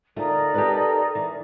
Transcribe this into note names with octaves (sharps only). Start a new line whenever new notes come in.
D2 A3 D#4 F4 A#4 D5
G4 A4 B4
E3